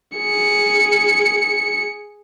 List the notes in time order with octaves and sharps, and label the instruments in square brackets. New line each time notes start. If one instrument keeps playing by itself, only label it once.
[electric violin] G#4 C#7